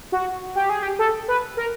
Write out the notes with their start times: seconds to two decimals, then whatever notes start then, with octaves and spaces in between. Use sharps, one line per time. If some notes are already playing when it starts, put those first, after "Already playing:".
0.12 F#4
0.55 G4
0.70 G#4
0.83 G4
0.99 A4
1.28 B4
1.57 A#4